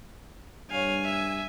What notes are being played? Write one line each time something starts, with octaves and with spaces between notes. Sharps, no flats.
G2 C#5 F5 G#5
E5